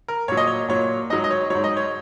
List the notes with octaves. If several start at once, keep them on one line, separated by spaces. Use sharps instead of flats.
A#4
A#2 F#3 C#5
D#5
C#5
A#2 F#3 C#5
G#2 F#3 D#5
D#5
C#5
G#2 F#3 C#5
D#5
C#5